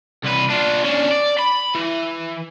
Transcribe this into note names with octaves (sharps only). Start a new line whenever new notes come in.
C2 B4
D4 F4
C#4 D4
D5
B5
E3